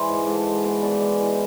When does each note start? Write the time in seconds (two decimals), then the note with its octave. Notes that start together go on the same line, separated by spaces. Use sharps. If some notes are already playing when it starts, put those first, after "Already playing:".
Already playing: E3 G#3 C5 D5
0.09 G#2
0.27 G#2 A4
0.46 G#3
0.64 B2
0.83 B2 D5
1.01 G#3
1.19 E3